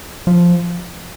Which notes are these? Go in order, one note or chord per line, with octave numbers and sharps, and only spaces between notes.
F3